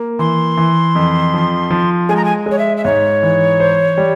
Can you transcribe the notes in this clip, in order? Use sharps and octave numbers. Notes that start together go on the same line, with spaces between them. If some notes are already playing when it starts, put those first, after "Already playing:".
Already playing: A#3
E3 C6
E3
F2
F3
F3
G#3 G#5
A#5
G#5
G#3 C#5
E5
E5
G#2 C#5
E3
C5
G3